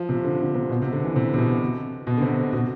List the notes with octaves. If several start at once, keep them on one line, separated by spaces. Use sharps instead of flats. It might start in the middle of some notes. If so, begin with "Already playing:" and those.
Already playing: F3
C3
D3
D3
C3
B2
C3
D3
E3
C3
C3
B2
B2
D3
C3
B2